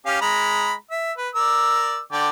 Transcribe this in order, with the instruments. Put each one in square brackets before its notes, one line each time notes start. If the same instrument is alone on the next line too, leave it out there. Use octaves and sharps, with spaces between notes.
[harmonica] C#4 G4 F5
G#3 A#5 B5
E5
B4
A#4 D5 E6
D3 D5 G5